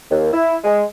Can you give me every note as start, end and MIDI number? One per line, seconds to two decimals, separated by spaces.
0.10 0.28 39
0.33 0.56 64
0.64 0.83 56